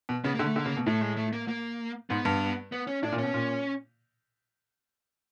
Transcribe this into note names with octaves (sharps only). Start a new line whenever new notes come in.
B2
C#3 B3
D3 A#3
A3
D3 A#3
C#3
B2
A2 A3
G#3
A3
A#3
A#3
G#2 B3
G2
B3
C#4
A2 D4
A#2
C#4
B2
A#2